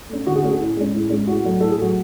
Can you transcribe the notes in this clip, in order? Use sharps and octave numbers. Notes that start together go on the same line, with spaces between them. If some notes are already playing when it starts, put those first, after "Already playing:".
A3 C#4
D3 F#4
G#4
A3 C#4 F#4
G#4
A2
G#3 C#4
A2
G#3 C#4
A2 F#4
F#3 A3
A2 A4
G#4
F#3 A3 F#4